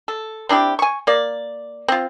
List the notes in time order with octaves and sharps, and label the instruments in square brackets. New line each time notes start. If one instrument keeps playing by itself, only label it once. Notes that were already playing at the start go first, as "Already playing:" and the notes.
[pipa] A4
C4 D4 E4 G4
G#5 C#6
A#3 D5
C4 F4